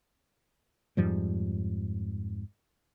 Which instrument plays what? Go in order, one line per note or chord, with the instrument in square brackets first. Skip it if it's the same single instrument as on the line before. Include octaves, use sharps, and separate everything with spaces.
[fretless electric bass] F2 G#2 F3 G3